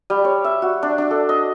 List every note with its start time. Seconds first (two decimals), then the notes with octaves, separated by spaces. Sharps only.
0.10 G3
0.25 C#5
0.44 E5
0.62 F#4
0.83 D4
0.98 D4
1.11 A4
1.29 D#5